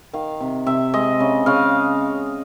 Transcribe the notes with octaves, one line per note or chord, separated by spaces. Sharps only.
D#3 F5
C3
C3 E5
G#3 D#5
C#3
C#3 F5